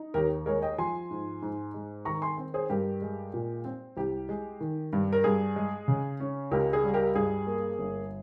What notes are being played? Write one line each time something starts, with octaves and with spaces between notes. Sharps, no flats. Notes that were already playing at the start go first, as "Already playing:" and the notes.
Already playing: D#4
D#2 G4 A#4
G#3 A#4 C#5
D#5 G5
F3 G#5 C6
G#2
G#2
G#3
D#3 A#5 C#6
G#5 C6
C4
G#4 C5
G2 G4 A#4
G#3
A#2
C4
C2 G4
G#3
D#3
G2
A#4
G2 G#4
G#3
C#3
C#4
C#2 G4 A#4
G#4
G3
G4 A#4
G2 G#4
A#3
G1